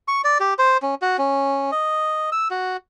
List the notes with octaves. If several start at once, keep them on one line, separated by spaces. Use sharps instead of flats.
C#6
D5
G4
C5
C#4
F#4
C#4
D#5
E6
F#4